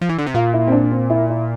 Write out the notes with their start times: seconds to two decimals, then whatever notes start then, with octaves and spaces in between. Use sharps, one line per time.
0.01 F3
0.09 E3
0.19 D3
0.27 C3
0.34 A#2 F4
0.53 E4
0.67 C4
0.72 D4
0.91 C4
1.10 E4
1.30 E4